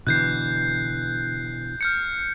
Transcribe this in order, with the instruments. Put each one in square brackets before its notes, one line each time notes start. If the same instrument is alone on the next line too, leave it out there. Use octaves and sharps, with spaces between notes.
[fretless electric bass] B2 D3 E3 [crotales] F#6 G6 C7
[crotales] F6 G6 C#7